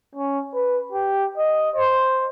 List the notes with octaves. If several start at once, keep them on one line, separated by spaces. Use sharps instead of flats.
C#4
B4
G4
D#5
C5